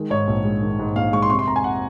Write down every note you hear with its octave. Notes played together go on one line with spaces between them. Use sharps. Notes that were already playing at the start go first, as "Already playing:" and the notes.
Already playing: D#3 G#3
G#2 C#5
A#1
G#3
D#3
G#2
A#1 F5
G#3 C#6
C6
C3 C#6
C6
F2 A#5
G#5
F#5